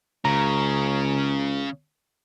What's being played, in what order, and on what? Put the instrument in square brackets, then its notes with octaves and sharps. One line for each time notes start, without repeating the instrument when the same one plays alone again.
[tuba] C#2 [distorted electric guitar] C#3 [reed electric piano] A#5